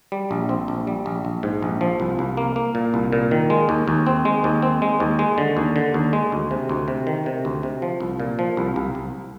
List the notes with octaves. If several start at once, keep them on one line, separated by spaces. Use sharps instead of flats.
G3
A#1
C4
A#1
G3
A#1
A#1
G#2
A#1
F3
C2
C2
A#3
A#3
A#2
C2
A#2
D#3
G#3
D#2
D#2
C4
G#3
D#2
C4
G#3
D#2
G#3
D3
D#2
D3
D#2
G#3
D2
C3
D2
C3
D#3
C3
D2
C3
F3
C2
A#2
F3
C2
C2
C2